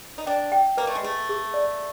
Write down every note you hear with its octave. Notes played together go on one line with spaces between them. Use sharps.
D#4
D4 G5
G5
A#3 B4
A3
G#3
A3 G#4
G#4
D5